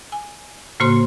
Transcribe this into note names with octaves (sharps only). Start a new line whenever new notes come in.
G#5
A2 C#3 A#3 F#4 C5 C6